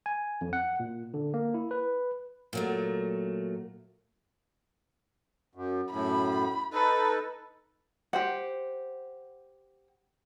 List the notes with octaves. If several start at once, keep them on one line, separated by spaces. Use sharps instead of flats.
G#5
F2
F#5
A#2
D3
A#3
E4
B4
A#2 F#3 A3
F#2
F#2 A2 B5
D#4 A4 B4
G4 C5 F#5